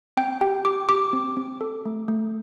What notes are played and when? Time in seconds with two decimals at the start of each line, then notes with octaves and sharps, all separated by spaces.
0.17 C4 G5
0.41 G4 G5
0.65 G4 D6
0.89 G4 D6
1.13 C4
1.37 C4
1.61 A4
1.85 A3
2.08 A3